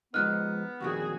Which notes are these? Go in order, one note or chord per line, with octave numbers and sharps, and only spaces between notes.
F3 G#3 B3 D#4 F6 F#6
F2 A#2 D#3 F#4 G#4